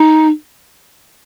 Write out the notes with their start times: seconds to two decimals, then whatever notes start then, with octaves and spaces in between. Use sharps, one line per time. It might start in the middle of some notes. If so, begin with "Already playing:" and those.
Already playing: D#4